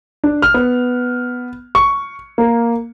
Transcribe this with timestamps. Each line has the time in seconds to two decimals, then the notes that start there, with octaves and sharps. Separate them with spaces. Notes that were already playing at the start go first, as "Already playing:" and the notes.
0.24 D4
0.42 F6
0.54 B3
1.75 C#6
2.38 A#3